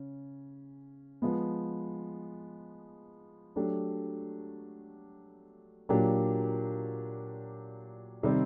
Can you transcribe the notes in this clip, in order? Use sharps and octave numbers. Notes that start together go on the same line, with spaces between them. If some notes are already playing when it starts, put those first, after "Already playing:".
Already playing: C#3 C#4
F3 G#3 B3
F#3 A3 D4 G4
A#2 F#3 A#3 D4 G4
C3 D#3 G3 C4